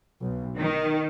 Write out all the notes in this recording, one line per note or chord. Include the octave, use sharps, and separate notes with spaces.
B1
D#3